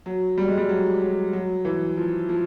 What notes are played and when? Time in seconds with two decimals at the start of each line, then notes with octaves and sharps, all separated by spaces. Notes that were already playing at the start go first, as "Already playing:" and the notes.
0.06 F#3
0.38 G3
0.48 G#3
0.58 G3
0.69 F#3
1.02 F#3
1.33 F#3
1.65 E3
1.97 F3
2.29 F3